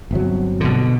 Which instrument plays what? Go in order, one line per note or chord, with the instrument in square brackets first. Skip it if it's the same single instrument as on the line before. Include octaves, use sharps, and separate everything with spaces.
[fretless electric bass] G1 C3 F#3
[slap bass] B2 D3